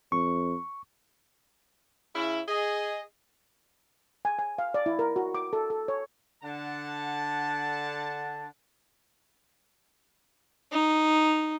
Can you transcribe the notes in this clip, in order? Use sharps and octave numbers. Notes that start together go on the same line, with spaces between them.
F2 C#6
C#3 E4
G#4 D#5
G#5
G#5
F5
D5
E4
A#4
F#4
D6
A4
A4
C#5
D3 F#5 A5
D#4